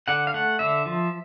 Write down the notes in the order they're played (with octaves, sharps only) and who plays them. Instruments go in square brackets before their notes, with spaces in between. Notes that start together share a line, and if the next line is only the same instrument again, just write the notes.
[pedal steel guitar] D3 F#5
F5
A3 F#5
D3 E5
F3